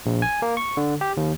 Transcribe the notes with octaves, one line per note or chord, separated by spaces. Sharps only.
A#1
G#5
A#3
C#6
D3
G4
D#2